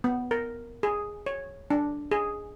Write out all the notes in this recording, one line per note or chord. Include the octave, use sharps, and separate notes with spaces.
B3
A#4
G#4
C#5
D4
G#4